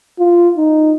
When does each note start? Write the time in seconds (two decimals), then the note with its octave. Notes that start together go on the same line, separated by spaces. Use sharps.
0.19 F4
0.57 D#4